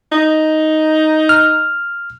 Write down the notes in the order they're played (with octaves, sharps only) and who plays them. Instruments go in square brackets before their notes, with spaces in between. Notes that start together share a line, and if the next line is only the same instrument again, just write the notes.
[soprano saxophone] D#4
[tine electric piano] F6